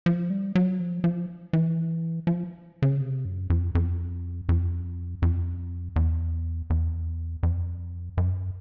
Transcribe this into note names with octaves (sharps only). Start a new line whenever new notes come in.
F3
G3
F#3
F3
F3
E3
F3
C#3
C3
F#2
F2
F2
F2
F2
E2
E2
F2
F#2